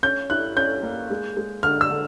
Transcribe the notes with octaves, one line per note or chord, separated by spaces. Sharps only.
C#4 G6
E4 F#6
C#4 G6
A#3
G#3
G#3
D3 F6
E6
D3